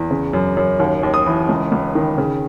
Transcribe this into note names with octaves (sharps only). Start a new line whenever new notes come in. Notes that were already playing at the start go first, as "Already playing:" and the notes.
Already playing: E2
C#3
F#2
F#2
D#2
D#2
D#6
E3
C#2
C#2
D#3
C#3